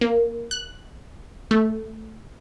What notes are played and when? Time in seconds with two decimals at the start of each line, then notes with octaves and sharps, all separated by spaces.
0.01 A#3
0.51 F#6
1.51 A3